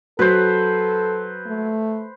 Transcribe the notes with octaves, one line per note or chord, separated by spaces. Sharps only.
F#3 A4 B4 C5
A3